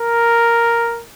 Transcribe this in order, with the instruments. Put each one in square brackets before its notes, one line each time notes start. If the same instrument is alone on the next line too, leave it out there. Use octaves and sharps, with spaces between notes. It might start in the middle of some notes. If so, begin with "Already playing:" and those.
Already playing: [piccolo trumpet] A#4